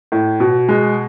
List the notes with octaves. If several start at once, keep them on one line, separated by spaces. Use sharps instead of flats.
A2
B2
G#3